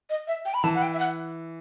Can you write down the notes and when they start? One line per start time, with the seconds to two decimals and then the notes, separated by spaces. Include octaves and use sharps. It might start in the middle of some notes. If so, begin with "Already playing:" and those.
0.10 D#5
0.28 E5
0.45 G5
0.54 B5
0.64 E3 A5
0.75 F#5
0.82 G5
0.93 E5
0.99 F#5